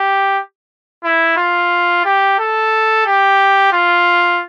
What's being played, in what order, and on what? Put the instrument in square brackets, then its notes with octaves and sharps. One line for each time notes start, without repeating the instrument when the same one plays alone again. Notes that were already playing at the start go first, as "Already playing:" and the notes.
Already playing: [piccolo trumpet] G4
E4
F4
G4
A4
G4
F4